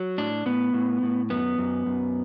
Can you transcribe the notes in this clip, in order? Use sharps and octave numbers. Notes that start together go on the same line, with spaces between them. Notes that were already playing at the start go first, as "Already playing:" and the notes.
Already playing: F#3
A2 D4
A2 B3
A2
A2
F#2 B3
F#2
F#2